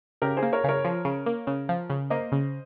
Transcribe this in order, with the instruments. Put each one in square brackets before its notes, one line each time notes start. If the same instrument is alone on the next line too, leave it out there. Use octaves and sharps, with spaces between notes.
[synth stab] C#3 [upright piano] G4 A#4
[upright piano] G#4 C5
[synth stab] A#3
[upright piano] A#4 C#5
[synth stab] C#3 [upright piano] A#4 C#5
[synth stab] F3
C#3
A#3
C#3
F3
C#3
[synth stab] A#3 [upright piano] C5 D#5
[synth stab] C#3